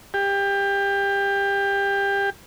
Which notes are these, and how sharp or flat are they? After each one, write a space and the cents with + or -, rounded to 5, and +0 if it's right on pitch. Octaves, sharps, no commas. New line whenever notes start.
G4 +25